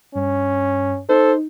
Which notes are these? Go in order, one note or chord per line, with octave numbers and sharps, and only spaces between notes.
G2 C#4
D#4 A4 C5